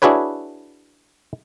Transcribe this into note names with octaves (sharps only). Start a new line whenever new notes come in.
D4 E4 F#4 G#4 B4 C#5